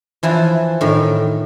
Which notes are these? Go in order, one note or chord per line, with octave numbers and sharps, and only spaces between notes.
E3 F3 E4
A2 D#3